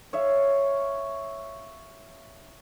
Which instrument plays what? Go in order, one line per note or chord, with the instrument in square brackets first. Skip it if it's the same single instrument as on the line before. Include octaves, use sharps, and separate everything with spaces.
[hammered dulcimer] C#5 E5 F5